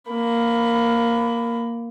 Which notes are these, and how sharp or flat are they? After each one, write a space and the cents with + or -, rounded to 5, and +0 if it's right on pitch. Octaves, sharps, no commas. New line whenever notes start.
A#3 +0 B5 +15